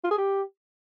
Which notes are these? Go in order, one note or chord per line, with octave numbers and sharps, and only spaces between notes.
F4
G#4
G4